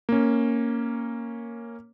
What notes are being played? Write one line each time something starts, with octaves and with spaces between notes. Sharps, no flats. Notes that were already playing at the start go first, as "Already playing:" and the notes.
A#3 C#4